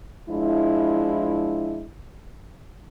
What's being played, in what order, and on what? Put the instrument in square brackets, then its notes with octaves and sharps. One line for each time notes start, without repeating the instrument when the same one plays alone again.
[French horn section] F3 G#3 D4 E4